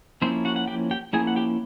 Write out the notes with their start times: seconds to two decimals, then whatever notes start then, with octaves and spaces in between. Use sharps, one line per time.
0.22 F3 A#3 C4 C#4 E4 C5
0.45 F#4 F#5
0.56 F#5
0.68 G4 G5
0.91 G4 G5
1.13 F3 A#3 C#4 E4 G#4 G#5
1.27 F#5
1.36 G4 G5